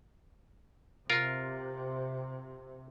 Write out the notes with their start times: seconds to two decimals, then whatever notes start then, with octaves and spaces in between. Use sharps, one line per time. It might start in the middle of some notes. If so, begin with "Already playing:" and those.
1.10 C3 F4 A#4